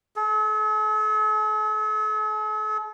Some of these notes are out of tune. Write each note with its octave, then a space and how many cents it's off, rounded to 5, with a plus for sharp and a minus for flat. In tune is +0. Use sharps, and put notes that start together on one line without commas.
A4 -45